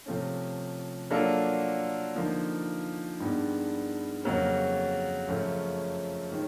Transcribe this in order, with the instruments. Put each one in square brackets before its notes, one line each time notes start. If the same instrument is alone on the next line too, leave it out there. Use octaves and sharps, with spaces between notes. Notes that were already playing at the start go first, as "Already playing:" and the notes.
[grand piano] C3 F3 A3 C#4
F#3 A#3 D4 F4 A4
D3 F3 A#3 D#4
G2 D#3 G#3 B3 D4
F2 C#3 F#3 A#3 C#4
F#2 C#3 F3 A3 C#4
D#3 G#3 C#4